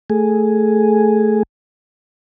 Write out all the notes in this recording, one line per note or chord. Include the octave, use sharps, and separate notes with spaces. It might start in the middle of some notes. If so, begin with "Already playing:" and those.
A3 G#4